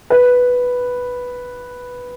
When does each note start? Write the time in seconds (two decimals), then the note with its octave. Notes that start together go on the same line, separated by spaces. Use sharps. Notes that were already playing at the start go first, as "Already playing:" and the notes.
0.10 B4